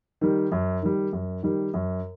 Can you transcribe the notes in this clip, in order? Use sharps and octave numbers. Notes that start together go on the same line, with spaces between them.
D#3 G3
F#2
D#3 G3
F#2
D#3 G3
F#2